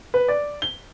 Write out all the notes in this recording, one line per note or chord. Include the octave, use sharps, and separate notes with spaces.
B4
D5
G7